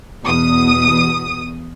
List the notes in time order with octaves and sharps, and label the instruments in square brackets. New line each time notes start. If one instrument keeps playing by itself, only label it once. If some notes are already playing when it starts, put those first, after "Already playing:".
[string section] E2 B2 D#6